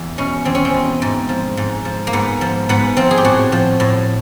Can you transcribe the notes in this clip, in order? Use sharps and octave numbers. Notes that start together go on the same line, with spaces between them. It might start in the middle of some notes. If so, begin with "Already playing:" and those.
Already playing: E2
B2 C#4
E2 C4
C#4
C4
B2
G#2
F3
G#2
F3
A#3
G#2 B3
F3
G#2 B3
F3 C4
G#4
G4
A2 F#4
F3
A2